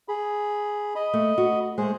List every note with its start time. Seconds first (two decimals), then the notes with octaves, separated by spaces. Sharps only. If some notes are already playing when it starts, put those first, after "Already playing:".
0.08 G#4 B5
0.95 D#5 B5
1.14 A3
1.38 F#4
1.78 G#3 A3 G#4 C5